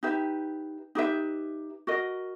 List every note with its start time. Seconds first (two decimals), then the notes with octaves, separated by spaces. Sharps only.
0.03 D#4 G4 B4 E5
0.95 D#4 G4 B4 E5
1.87 F#4 A#4 D#5